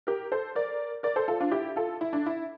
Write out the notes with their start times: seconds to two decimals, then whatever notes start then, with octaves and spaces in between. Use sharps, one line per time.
0.07 G4 A#4
0.32 A4 C5
0.55 A#4 D5
1.03 A#4 D5
1.16 A4 C5
1.28 F4 A4
1.40 D4 F4
1.51 E4 G4
1.76 F4 A4
2.01 E4
2.13 D4
2.26 E4